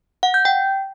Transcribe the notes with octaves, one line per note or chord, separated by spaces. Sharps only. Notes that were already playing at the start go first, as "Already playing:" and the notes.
F#5
G6
G5